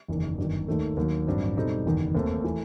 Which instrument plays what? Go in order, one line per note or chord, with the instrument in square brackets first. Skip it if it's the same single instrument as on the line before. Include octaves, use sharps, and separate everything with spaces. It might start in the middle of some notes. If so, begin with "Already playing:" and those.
[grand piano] F#1 E2 D#3
G1 F#2 D#3
D#2 D#3 A3 D#4
D#2 D#3 F#3
A1 G2 F#3 C4
B2 G3 C4 D#4 A4
F#1 E2 D#3
D#2 D#3 A3 C4
E3 A3